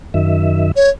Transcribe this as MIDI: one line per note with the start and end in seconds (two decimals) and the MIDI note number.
0.14 0.72 42
0.14 0.72 51
0.14 0.72 76
0.76 0.89 73